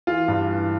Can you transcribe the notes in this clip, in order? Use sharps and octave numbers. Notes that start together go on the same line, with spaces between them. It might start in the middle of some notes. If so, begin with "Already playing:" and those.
E3 F4
G2
E3